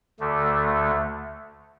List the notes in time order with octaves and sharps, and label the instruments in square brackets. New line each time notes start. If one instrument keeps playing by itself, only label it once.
[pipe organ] D2 D3 A3